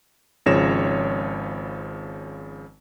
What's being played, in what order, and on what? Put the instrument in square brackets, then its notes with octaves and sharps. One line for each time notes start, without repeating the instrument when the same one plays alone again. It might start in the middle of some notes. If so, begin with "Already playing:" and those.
[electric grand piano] G#1 C#3 F3 C#5 A#6 E7